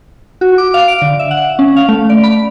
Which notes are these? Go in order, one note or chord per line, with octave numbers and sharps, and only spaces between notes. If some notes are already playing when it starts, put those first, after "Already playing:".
F#4
D6
F5
D7
D3
E5
F#5
C#4
F5
A3
D5
B5